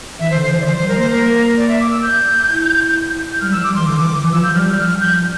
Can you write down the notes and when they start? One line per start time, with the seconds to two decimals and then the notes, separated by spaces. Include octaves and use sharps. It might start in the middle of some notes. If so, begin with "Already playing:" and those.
0.19 E3 E5
0.30 C5
0.35 D3
0.43 C5
0.50 E3
0.61 D5
0.66 F3 C5
0.77 C5
0.81 G3
0.88 A#4
0.96 A#3 C5
1.11 A#3 A#4
1.57 D5
1.69 E5
1.80 D6
1.91 E6
2.03 G6
2.49 E4
3.33 G6
3.41 G3 F6
3.52 F3 E6
3.63 G3 D6
3.75 E3 C6
3.86 D3 D6
3.98 E3
4.09 E3
4.21 E3
4.32 F3 E6
4.44 G6
4.51 F3
4.55 G3 F6
4.67 G6
4.78 F3 F6
5.01 G6